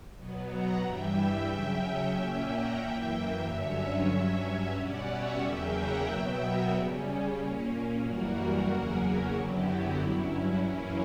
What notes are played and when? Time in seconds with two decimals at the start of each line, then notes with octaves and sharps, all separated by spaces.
0.16 B2 F#3 B3
0.48 F#5 A#5
0.80 G2 E3 G3 E5 G5
1.47 C#3 F#3 C#4
2.12 A#2 A#3 C#4 E5 G5
2.44 F#5 A#5
2.77 F#2 E3 A#3 E5 G5
3.10 E5 G5
3.43 G2 D3 F#3 C#4 C#5 E5
4.09 G2 F#3 C#4
4.74 B2 G3 C#4 D5 F#5
5.07 C#5 E5
5.39 E2 C#3 F#3 A#3 C#4 E5 G5
5.72 F#5 A#5
6.05 B2 F#3 B3 E5 G5
6.38 F#4 A#4
6.70 C#3 G3 C#4
7.36 A#2 A#3 C#4
8.01 F#2 E3 G3 A#3 F#4 A#4
8.68 E2 C#3 F#3 A#3 C#4
9.33 F#2 D3 F#3 B3 E4 G4
9.66 F#4
9.98 G2 F#3 C#4 E4
10.64 F#2 E3 A#3 C#4